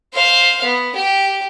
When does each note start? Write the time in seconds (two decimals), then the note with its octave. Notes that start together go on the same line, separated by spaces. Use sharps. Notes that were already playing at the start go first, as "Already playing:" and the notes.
0.13 C5 F5
0.64 B3
0.95 G4